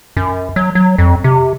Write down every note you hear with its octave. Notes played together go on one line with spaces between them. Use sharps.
F#2
F#3
F#3
F2
C3